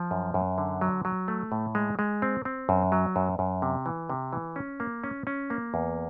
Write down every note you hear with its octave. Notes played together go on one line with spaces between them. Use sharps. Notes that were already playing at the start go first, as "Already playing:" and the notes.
Already playing: F3
F#2
F#2
D3
F#3
F#3
A3
A2
G#3
G#3
C4
C4
F#2
F#3
F#2
F#2
C3
E3
C3
E3
C#4
A#3
C#4
C#4
A#3
E2